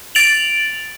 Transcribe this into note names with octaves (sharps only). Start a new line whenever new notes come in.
A6 D7 F7 F#7